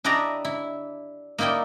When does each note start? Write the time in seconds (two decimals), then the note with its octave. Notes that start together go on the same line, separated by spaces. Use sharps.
0.04 D4 E4 G4 D5 D#5 A#5
0.45 E4
1.38 A#3 D#4 E4 D5 G5